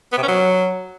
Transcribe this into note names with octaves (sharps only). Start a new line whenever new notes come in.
B3
C3
C#4
F#3